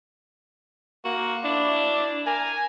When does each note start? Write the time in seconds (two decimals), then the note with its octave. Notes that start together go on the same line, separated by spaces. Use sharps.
1.05 A#3 F#4
1.44 D4 E4
2.26 A#4 G#5